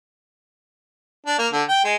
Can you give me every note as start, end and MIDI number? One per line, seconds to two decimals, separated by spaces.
1.26 1.38 62
1.38 1.47 58
1.53 1.63 50
1.69 1.83 79
1.84 1.95 56